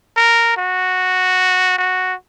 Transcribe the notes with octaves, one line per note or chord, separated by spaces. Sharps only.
A#4
F#4
F#4